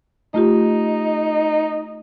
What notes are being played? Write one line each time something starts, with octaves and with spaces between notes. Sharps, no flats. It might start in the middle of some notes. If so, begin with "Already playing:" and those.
A3 D#4 F4 G4